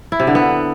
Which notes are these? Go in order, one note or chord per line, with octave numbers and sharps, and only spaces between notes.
E4
C3
D3
B3